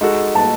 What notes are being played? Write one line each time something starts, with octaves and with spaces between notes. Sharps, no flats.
G#3 D#4 F#4 A4
A5